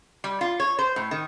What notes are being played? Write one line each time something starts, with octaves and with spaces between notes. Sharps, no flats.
G3
F4
C#5
C5
A2
D#3